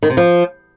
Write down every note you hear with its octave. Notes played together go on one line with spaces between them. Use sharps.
D#3
C3
F3